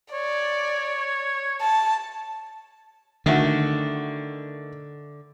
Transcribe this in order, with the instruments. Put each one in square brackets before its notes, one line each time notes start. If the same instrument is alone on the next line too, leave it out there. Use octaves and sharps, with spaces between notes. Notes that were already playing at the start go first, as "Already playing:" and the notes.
[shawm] C#5 [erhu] D5
[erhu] A5
[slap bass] D3 [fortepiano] D#3 A3 F#4